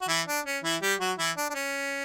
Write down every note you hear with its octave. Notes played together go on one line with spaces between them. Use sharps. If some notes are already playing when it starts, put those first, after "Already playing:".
F#4
E3 E4
D4
C#4
E3 E4
G3 G4
F#3 F#4
E3 E4
D4
D4
C#4